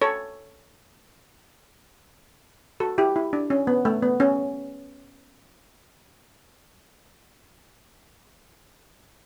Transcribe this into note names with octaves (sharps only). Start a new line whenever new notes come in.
A4 C#5
F#4 A4
E4 G4
E4
D4
C#4
B3
A3
B3
C#4